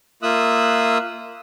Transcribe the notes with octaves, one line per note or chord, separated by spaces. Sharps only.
A#3 F4 E5 D#6 E6 F#6